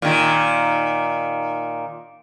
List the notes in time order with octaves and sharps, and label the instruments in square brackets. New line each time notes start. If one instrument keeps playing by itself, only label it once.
[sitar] A#2 D#3